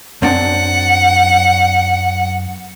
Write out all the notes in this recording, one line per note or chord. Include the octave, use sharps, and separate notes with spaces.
F#2 C4 D4 F#5